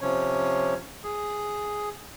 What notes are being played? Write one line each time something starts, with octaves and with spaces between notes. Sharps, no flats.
C3 F3 C#4 C#5
G#4